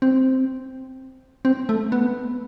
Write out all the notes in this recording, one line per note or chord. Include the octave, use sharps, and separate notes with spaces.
C4
C4
A3
B3